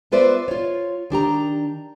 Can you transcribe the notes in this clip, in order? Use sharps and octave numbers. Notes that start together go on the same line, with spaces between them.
B3 F4 B4 C5 D5 E5
F4 C#5
D#3 D4 G4 A#5